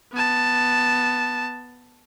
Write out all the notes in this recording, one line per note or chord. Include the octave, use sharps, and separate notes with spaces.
B3 A5